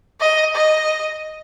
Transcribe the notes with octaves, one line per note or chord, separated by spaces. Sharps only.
D#5
D#5